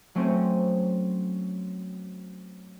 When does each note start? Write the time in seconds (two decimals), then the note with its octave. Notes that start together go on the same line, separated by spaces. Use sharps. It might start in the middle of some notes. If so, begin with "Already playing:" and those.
0.15 F#3 A3 C4 C#4